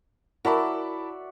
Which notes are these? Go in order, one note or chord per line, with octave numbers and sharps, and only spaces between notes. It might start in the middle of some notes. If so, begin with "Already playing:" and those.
E4 F#4 A#4 D5 E5 A5 B5